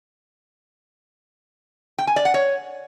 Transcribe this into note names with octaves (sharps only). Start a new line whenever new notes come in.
G5
G#5
D5
F#5
C#5